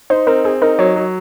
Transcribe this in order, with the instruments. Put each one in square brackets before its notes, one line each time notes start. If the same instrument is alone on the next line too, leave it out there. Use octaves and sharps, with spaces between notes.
[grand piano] D#4 [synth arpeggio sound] C5
[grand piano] C4 [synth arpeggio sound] A#4
[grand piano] C4 [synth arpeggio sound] G#4
[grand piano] D#4 [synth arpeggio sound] A#4
[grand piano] F#3 [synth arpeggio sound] C#5
[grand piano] F#3